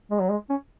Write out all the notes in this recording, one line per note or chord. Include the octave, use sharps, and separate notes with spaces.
G#3
F#3
G#3
C#4